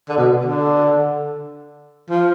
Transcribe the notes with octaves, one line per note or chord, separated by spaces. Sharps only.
D3
B2
D3
F3